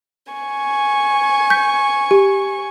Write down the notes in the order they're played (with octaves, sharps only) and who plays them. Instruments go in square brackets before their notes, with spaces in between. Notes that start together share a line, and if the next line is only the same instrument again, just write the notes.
[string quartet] G#5 C#6
[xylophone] G6 B6
G4